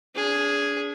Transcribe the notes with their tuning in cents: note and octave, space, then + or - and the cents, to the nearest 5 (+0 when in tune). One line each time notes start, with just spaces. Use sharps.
D4 -35 G#4 +0